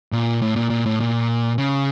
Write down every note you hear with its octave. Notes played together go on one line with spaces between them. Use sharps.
A#2
A2
A#2
A#2
A2
A#2
C#3